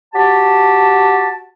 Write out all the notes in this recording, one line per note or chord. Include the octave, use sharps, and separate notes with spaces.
F#4 G4 A5